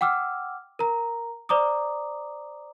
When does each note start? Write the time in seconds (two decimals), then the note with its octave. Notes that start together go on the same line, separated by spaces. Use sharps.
0.01 F#5 G5 D6 E6 F6
0.79 A#4 A#5
1.49 C5 D5 A#5 D6 D#6